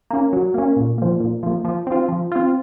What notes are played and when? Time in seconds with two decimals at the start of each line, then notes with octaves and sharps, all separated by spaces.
0.10 A#3 C#4
0.33 F#3
0.54 A#3 C#4
0.77 A#2
0.98 F3 A#3
1.20 A#2
1.43 F3 A#3
1.65 F3
1.87 C4 F4
2.09 F3
2.32 C4 F4